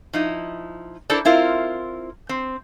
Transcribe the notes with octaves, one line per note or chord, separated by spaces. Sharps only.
F3 D#4 E4
D4 E4 A4 A#4 C5 D5
C4 E4 F4 A#4
C4